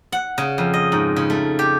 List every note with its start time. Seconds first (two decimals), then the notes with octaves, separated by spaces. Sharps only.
0.12 F#5
0.38 C#3
0.58 F2
0.74 D#5
0.92 G#2
1.16 C#3
1.30 A3
1.59 G4